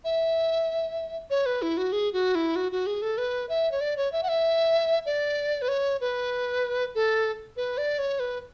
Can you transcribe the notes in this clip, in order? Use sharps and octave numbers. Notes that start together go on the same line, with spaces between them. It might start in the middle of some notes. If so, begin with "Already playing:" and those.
E5
C#5
B4
E4
F#4
G#4
F#4
E4
F#4
F#4
G#4
A4
B4
E5
C#5
D5
C#5
E5
F#5
E5
D5
B4
C#5
B4
A4
B4
D5
C#5
B4